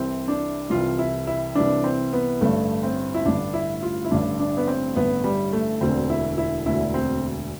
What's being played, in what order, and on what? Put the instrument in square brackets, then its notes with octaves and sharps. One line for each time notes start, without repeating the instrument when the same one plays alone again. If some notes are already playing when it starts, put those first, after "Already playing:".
Already playing: [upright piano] C2 C3 E3 C4
D4
C2 C3 E3 F4
E4
E4
C2 C3 E3 D4
C4
B3
A1 G2 D3 A3
C4
E4
A1 G2 D3 D4
E4
F4
E4
A1 G2 D3 D4
D4
B3
C4
A1 G2 D3 B3
G3
A3
E1 D2 D3 C4
E4
E4
E1 D2 D3 E4
C4